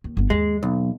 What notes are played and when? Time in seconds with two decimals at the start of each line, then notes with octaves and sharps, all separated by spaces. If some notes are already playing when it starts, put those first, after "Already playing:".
0.04 D#2
0.17 G1 B3
0.30 D#2 G#3
0.63 B1